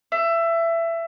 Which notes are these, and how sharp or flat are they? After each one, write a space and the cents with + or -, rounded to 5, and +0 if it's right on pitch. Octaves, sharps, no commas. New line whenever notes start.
E5 +20